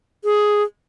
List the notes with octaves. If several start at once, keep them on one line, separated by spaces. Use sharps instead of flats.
G#4